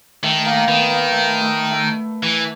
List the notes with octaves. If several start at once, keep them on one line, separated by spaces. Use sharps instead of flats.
D#3 A3
A#3
D#3 B3
A#3
A3
A3
A3
E3